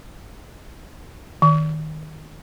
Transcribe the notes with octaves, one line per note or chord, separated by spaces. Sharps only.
D#3